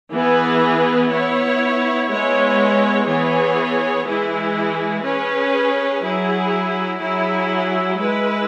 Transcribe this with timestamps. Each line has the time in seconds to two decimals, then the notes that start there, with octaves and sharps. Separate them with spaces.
0.11 E3 B3 G#4 B4
1.09 B3 E4 C#5
2.09 G#3 B3 E4 C#5
3.07 E3 B3 G#4 C#5
4.05 E3 G#3 E4 G#4
5.04 C#4 G#4 B4
6.02 F#3 E4 G#4
7.00 F#3 E4 G#4
7.98 G#3 E4 B4